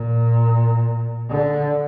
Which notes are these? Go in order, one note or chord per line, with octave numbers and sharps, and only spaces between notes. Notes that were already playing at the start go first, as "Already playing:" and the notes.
Already playing: A#2
D3